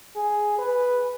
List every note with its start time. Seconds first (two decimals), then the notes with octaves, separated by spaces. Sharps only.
0.16 G#4
0.58 B4